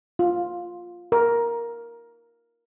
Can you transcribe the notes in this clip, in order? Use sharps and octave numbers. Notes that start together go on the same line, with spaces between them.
F4
A#4